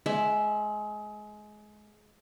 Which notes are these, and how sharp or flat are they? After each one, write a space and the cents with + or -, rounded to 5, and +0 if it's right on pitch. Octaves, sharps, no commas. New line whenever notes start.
G#3 +25 E5 +0